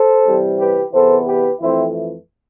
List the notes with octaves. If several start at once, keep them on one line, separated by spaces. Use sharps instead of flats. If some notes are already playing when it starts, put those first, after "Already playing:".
Already playing: A4 C5
C3 E3 G3 C4
G4 B4
E2 C3 E3 B3 A4 C5
G4 B4
F2 E3 A3 C4 E4